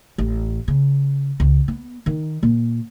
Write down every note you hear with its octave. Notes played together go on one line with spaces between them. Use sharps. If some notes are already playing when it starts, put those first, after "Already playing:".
A1
C#3
C#2
B3
D#3
A#2